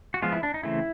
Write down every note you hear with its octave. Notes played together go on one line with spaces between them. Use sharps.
F#4
F3 G#3 B3 F4
E4
D4
D#4
C#3 E3 A3 C4 E4